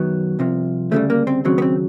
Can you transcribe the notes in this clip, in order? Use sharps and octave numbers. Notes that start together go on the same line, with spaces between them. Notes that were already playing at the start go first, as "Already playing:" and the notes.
Already playing: F#2 D#3 F#3 B3
C2 C3 F3
D2 C#3 E3 G3 A3
A#3
C4
D#2 C#3 F#3 C4
B3
C4